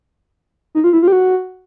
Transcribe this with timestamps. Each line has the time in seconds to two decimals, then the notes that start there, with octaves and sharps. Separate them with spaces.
0.75 D#4
0.84 F4
0.93 E4
1.02 F4
1.08 G4
1.12 F#4